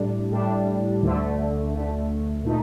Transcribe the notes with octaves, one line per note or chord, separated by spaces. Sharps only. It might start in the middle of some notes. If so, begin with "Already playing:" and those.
Already playing: A2 G3 D4
A2 G3 D4
D2 D3 A3
D2 D3 A3
A#2 A3 D#4